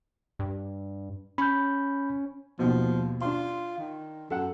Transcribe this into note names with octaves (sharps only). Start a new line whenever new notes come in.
G2
C#4 B5 G6
D#2 B2 F3
D4 F4 C6
D#3
F#2 A4 F#5